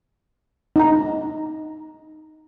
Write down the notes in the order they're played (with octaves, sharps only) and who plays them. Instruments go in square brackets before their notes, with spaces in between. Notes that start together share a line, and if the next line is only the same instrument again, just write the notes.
[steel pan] D#4 A#5